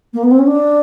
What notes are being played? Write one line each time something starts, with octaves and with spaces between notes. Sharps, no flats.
A#3
B3
C4
C#4
D4